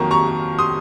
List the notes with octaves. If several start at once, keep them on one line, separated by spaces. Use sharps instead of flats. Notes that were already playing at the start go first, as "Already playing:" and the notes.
Already playing: F2 D#3 F#3 A#3 A#5 C#6
A#5 C#6
C6 D#6